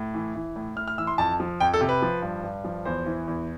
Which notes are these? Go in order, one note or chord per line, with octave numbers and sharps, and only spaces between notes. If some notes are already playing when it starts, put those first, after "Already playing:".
Already playing: A2
E3
E3
A2
A2 F6
F6
E3 E6
C6
F2 A5
F3
F2 G5
A4
C3
B4
F3
G2
G2
F3
E2 C5
E3
E2